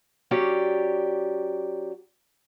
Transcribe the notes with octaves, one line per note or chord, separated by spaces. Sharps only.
F#3 C#4 G4 D5